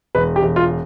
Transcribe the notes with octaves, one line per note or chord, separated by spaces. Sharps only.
E1 B4
G4
E1
F4